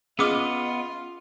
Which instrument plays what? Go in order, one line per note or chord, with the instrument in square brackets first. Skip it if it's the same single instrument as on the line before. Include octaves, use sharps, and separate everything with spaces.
[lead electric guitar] B3 D#5 [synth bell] C#4 F6 [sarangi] F4 [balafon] G#4 D6